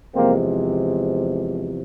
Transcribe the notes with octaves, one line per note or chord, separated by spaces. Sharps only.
E2 C3 F3 G#3 A#3 C4